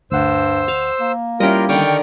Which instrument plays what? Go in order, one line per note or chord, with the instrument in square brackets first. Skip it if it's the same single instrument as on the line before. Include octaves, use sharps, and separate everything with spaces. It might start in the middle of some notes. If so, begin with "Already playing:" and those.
[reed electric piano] D2 F#5 [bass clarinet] G2 [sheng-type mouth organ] C5 E6
[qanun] F5
[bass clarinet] A#3
[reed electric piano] G3 C#4 [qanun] E4 G4 D#5 [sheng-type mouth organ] F4 A#4
[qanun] D3 D#3 [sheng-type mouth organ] G5 C#6 F6